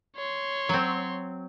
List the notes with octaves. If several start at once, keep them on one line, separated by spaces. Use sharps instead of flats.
C#5 C6
F#3 C4